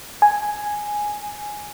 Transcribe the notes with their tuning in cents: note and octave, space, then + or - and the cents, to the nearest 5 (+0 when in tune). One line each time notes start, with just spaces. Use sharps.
G#5 +0